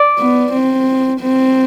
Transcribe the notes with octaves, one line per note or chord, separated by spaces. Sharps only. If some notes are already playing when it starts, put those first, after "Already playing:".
Already playing: D5
B3
C4
C4